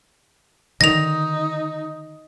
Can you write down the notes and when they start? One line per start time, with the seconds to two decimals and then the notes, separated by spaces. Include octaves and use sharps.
0.81 D3 D#3 D#4 A#6 F7